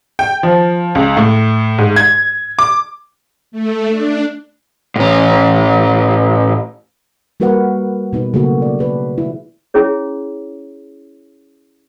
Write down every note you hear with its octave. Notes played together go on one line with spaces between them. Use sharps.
G5
F3
C#2
A2
G#2
G#6
D6
A3
D4
A2 C#4
G3 A#3 F#4 A#4 B4 F#5
B2 B3 D#4 B4
C#3 F#3 A3 A#3 F#4
D5
G#4 B4 D5
E4
C#4 E4 G#4 C#5